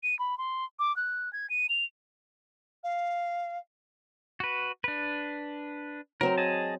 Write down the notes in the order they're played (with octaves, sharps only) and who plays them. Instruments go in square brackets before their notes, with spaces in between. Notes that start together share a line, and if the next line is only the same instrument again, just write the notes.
[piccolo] D#7
B5
C6
D6
F#6
G#6
D#7
F7
[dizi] F5
[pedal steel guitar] F#4 B4
D4 B4
[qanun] F#3 C4 C5 [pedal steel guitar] A#4
[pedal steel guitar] G#4 D#5 A5